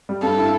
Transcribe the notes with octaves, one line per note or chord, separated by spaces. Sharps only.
G3
G2 A4
E4